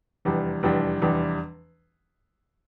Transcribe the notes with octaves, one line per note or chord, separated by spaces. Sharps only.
F1 E2 E3 G3 D4
F1 E2 E3 G3 D4
F1 E2 E3 G3 D4